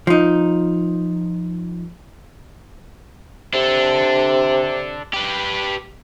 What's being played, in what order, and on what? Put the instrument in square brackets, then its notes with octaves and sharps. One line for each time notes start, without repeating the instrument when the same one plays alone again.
[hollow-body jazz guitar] F3 D#4
[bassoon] C3 [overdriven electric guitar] D4 A4
[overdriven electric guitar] G4 B4